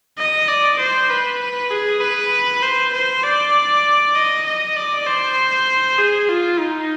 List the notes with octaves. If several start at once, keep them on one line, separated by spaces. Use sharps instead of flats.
D#5
D5
C5
B4
G#4
B4
C5
C5
D5
D#5
D#5
D5
C5
G#4
F4
D#4